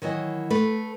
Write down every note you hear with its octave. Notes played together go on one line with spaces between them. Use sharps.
D#3 E3 F#3 D#5
A3 B4